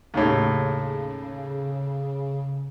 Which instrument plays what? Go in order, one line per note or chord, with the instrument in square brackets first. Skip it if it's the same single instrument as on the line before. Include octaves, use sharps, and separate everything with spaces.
[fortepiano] D#2 A2 [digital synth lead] C#3